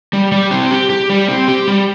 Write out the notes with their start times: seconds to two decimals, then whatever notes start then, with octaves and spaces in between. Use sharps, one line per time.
0.13 G3
0.32 G3
0.51 C4
0.71 G4
0.90 G4
1.10 G3
1.28 C4
1.48 G4
1.67 G3